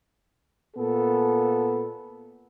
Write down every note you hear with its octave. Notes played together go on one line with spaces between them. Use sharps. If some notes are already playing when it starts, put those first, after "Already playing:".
A#2 B3 A4